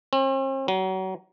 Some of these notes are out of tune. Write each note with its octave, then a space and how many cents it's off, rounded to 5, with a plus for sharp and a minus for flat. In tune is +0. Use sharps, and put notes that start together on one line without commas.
C4 +45
F#3 +30